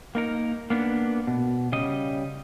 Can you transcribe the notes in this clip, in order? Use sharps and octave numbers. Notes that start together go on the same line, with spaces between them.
A#3 D#4 A#4
A#3 B3 D4
B2
C#3 G3 D#5